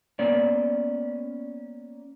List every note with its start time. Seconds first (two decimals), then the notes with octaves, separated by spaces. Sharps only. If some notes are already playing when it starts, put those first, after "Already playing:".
0.19 A#3 B3 C#4 D5